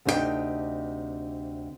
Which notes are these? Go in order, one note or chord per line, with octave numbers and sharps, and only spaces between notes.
D2 C3 D4 D#4 G4 G5